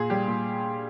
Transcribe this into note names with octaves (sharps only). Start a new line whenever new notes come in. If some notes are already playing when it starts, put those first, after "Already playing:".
Already playing: A#2 G#4
G3 G4
A#2